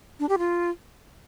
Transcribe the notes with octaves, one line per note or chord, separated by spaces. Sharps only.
D4
G4
F4